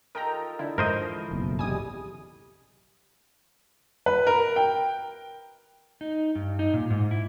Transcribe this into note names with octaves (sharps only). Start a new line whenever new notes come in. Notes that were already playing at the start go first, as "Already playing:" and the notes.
D#4 F4 A4 A#4 G5 A#5
D3 E4
E3 F3 G#3 A#4 C5 D#5
F#1 B1 F2
G3 G#3 G#5 D#6
B4
A#4
G5
D#4
G2
D#4
A#2
G#2
E4